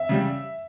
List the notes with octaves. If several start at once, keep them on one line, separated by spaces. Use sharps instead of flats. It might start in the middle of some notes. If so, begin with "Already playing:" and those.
Already playing: E5
C#3 G3